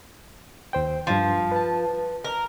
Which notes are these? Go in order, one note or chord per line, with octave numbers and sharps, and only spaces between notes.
D#2 C5 G5
G2 F3 C6
B4 A5
A#4